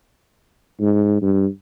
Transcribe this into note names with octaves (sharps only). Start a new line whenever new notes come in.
G#2
G2